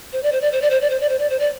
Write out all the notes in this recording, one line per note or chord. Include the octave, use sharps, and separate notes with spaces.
C5
D5
C5
D5
C5
D5
C5
D5
C5
D5
C5
D5
C5
D5